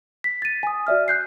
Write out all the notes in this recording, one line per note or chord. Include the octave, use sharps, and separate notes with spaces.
B6
A6 D#7
G#5 D#6
F#4 D5 E5 F6
F#6 G6 C7